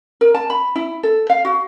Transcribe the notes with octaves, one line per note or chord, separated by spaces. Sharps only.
A#4
A5
B5
E4
A4
F5
F#4